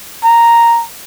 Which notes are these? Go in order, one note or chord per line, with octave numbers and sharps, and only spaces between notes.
A#5